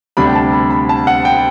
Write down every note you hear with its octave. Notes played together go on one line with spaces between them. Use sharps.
D2 C3 G3 D4 B5
G5
A5
B5
B5
A5
F#5
G5